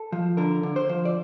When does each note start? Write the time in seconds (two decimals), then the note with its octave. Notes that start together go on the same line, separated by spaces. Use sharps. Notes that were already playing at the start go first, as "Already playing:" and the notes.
Already playing: A4
0.12 F3
0.37 D3 A#4
0.63 D3
0.76 C5
0.89 F3
1.05 D5